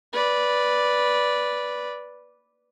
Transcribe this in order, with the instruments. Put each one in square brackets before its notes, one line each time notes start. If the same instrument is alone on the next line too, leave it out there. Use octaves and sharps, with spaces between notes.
[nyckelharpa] B4 D5